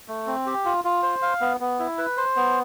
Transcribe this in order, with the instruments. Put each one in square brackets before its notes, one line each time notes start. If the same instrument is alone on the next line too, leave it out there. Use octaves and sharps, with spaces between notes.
[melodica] A3
C4
G4
F4
F4
C5
F5
B3
B3
E4
B4
C5
B3